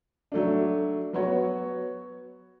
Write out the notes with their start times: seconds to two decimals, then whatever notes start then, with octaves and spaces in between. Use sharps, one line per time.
0.32 F#3 A3 D4
1.13 F#3 B3 F#4 C#5